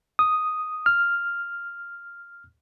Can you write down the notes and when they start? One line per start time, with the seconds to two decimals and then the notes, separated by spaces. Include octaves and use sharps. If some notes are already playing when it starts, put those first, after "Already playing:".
0.19 D#6
0.86 F6